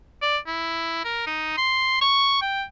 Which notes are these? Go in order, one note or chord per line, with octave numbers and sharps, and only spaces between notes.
D5
E4
A#4
D#4
C6
C#6
G5